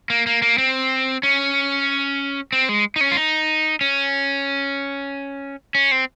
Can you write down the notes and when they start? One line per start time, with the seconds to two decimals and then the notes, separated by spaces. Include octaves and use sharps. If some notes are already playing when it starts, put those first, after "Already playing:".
0.10 A#3
0.27 A#3
0.42 A#3
0.58 C4
1.23 C#4
2.52 C4
2.69 G#3
2.96 D#4
3.01 C#4
3.11 F4
3.17 D#4
3.81 C#4
5.75 C#4
5.91 C4